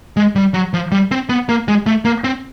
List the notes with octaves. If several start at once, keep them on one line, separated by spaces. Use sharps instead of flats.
G#3
G3
F#3
F3
G3
C4
B3
A#3
G#3
A3
A#3
C4